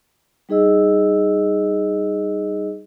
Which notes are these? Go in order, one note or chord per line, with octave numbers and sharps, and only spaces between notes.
G3 D#4 G#4 D#5 E6